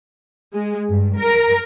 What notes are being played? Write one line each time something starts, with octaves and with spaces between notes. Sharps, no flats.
G#3
G2
A#4